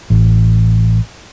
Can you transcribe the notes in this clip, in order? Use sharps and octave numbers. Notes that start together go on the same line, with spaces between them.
A1